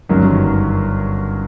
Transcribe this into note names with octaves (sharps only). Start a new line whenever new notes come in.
G1 F#2 D#3 F#3